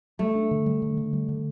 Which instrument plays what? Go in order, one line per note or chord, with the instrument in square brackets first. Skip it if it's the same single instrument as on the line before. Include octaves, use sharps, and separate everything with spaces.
[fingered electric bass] G3 [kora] A3
[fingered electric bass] D4
D3
G3
D3
D3
G3
D3